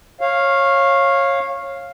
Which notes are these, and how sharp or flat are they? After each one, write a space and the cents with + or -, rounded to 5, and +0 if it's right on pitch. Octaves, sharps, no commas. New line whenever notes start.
C#5 -20 F5 +0